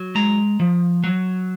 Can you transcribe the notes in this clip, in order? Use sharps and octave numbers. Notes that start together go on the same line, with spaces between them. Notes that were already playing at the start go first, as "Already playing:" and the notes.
Already playing: F#3
G#3 A#5
F3
F#3